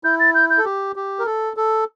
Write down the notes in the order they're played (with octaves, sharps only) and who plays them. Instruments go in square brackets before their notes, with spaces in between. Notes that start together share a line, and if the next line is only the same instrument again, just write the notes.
[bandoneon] E4 [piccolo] G6
[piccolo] A6
G6
G6
[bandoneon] A4
G4
G4
A#4
A4
A4